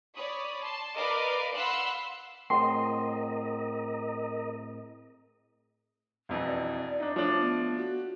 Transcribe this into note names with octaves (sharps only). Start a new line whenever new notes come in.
C#5 D5 B5 D#6
A5 C6
A#4 B4 D5 D#5 F5 D6
F5 F#5 B5 C6 E6 F#6
A2 C4 G#4 A#4 D#5 F#5 G5 C6
E1 F2 E3
D5
D4 D#4
F3 A3 D4 C#5
B3
F#4